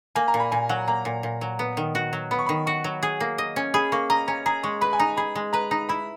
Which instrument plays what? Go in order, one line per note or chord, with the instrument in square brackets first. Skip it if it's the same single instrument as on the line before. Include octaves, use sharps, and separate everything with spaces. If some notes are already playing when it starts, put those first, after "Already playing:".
[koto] A#3 [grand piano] G#5
[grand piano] A#5
[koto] A#2
[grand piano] B5
[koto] A#2 [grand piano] G#5
[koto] F#3 [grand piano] F#5
[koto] A#3 [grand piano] A#5
[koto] A#2
A#2
F#3
B3
D#3
F#4
F#3
[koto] B3 [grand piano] B5
[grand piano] C#6
[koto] D#3 [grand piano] B5
[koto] F#4 [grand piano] C#6
[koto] F#3
G#4
A#3
D#5
C#4
[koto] G#4 [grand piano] B5
[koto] A#3 [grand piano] C#6
[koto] D#5 [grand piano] A#5
[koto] C#4 [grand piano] A#5
[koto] G#4 [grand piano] A#5
[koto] G#3 [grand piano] C#6
[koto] B4 [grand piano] B5
[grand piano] G#5
[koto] D#4 [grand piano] A#5
[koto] G#4 [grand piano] B5
[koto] G#3
[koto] B4 [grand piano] A#5
[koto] D#4 [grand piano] A#5
[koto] E4 [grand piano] B5